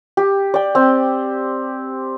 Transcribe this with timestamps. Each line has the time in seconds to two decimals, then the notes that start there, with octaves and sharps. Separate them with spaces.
0.17 G4
0.54 D5 G5
0.75 C4